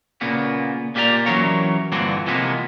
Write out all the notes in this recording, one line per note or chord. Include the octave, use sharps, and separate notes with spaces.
A#2 C#3 A#3 B3
A#2 A#3 G4 G#4 D5 A#5
E3 F#3 C#4 A#4 C#5
G2 A#2 D3 E3 C4 F#4
C3 E3 F3 G#3 A#3 B3